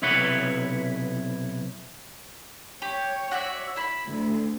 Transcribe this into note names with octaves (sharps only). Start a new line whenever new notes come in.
B1 C3 E4 B4 C#5 F#5
G4 C#5
F#4 D5 E5
E4 B5
D2